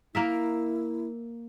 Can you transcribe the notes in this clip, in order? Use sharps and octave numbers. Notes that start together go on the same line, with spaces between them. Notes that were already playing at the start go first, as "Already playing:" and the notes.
A#3 E4 A#4 E5